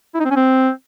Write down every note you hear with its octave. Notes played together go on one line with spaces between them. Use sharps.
E4
D#4
C4
C#4
C4